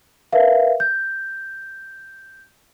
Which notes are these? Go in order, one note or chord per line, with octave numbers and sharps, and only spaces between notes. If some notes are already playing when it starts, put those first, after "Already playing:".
A#4 B4 E5 F5
G6